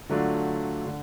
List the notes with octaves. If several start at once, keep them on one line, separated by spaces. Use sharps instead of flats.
D3 F#3 A3 D4 F4
D3